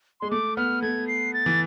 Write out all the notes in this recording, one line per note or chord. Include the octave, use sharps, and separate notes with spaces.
G#3 C6
A3 D6
B3 F6
A3 G#6
C7
A6
E3